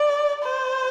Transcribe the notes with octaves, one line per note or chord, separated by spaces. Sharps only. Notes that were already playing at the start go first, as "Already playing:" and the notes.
Already playing: D5
C5